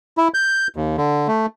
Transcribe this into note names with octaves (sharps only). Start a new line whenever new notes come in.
E4
G6
D#2
D3
A3